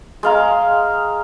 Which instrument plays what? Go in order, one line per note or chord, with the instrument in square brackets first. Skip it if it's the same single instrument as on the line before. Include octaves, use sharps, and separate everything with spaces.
[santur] G#3 F5 A#5